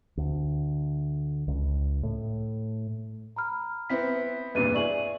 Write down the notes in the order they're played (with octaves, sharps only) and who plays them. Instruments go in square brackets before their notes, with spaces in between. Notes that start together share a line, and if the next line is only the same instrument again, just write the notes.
[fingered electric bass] D2
C#2
A2
[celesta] A#5 B5 F6
[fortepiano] B3 C4 E4 [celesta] B6
[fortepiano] E2 G2 A#2 [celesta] B4 D#7
[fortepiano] E4 G#4 [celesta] D5 C#6 F#7